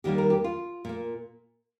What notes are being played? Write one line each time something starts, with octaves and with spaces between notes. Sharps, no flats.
D#2 D#3 G3 A#3 G4
A#4
G4
F4
A#2 A#3